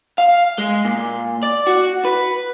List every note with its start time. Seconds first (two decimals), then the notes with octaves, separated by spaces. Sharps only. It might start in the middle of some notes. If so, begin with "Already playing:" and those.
0.18 F5
0.58 G#3
0.85 A#2
1.43 D5
1.67 F#4
2.05 B4